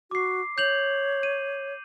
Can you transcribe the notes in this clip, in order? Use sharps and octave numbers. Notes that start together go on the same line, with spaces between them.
F#4 D6 C7
C#5 G6 F7 F#7
D#7